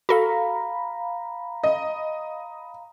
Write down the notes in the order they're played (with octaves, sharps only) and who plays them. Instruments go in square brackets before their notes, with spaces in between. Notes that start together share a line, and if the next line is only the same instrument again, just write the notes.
[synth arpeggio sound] F#4 A4 [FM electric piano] F5 A#5 B5
[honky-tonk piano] D#5